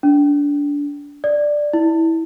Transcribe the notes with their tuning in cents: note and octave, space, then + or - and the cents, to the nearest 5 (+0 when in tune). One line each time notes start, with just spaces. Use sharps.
D4 -25
D5 +5
E4 -15